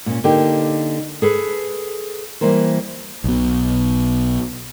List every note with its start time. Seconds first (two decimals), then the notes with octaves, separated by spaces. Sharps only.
0.06 A#2 C#4
0.24 D3 A#3 D#4 G4
1.22 G#4 A4 B4
2.41 E3 G3 A#3 A#4 C5
3.24 B1 B2